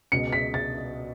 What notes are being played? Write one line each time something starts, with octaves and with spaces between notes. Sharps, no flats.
C#2 B2 C#7
B6
A6